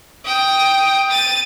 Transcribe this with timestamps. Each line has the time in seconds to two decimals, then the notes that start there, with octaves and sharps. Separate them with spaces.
0.25 G5 D#6
1.10 A6 D#7